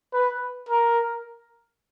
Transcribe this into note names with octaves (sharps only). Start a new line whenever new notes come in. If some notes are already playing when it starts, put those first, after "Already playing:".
B4
A#4